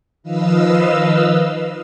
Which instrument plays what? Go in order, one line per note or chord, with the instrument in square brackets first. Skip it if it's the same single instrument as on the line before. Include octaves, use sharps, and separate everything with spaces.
[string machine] D#3 F3 B4 D#5 F5 E6